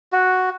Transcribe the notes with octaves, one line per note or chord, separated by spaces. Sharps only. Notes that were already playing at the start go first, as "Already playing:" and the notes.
F#4